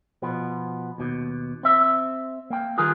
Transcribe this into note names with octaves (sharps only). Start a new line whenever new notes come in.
B2 F3 B3
D#2 B2
C4 E5
A#3 G5
D#3 G3 F4 G#4 A#4 B4